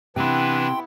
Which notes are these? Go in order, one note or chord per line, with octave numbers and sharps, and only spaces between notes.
C3 E3 B3 D4 E4 B4 G5 C6